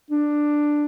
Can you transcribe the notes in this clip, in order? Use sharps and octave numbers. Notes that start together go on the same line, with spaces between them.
D4